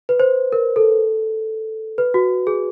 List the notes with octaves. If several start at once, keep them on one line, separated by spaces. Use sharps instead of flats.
B4
C5
A#4
A4
B4
F#4
G#4